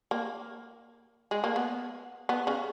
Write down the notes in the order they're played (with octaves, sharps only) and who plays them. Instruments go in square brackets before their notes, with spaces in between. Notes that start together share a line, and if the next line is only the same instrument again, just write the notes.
[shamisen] A#3
G#3
A#3
B3
B3
C#3